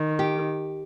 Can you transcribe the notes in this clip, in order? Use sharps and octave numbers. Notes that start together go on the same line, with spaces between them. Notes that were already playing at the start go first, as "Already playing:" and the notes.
Already playing: D#3
G4